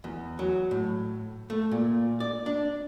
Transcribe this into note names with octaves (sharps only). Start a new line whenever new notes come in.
E2
F#3
A2
A3
A#2
D5
D4